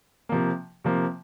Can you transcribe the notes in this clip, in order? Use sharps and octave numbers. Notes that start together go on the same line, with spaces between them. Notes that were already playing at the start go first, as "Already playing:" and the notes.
C3 F3 A#3
C3 F3 A#3